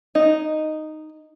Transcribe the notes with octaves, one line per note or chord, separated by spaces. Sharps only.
D#4